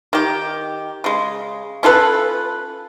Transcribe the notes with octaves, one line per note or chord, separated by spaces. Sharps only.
D#3 G4
C#3 G#3
C#4 F4 A4 B4